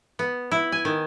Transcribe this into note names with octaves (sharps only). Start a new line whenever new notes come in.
B3
E4
G#5
D#3